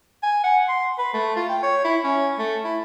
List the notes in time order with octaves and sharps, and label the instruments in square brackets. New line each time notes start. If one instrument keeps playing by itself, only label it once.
[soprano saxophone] G#5
F#5
C6
B4
A3
F4
G5
C#5
E4
C#4
A3
E4